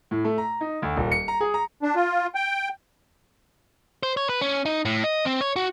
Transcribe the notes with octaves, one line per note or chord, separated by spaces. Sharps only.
A2
A3
A#5
D#4
D2
D#1
C#7
A#5
G#4
A#5
D4
F4
G5
C5
C#5
B4
C#4
D#4
A2
D#5
C4
C#5
F#4